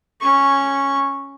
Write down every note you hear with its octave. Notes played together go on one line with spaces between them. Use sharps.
C#4 C#6